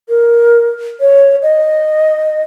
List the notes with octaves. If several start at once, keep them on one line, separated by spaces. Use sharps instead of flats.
A#4
C#5
D#5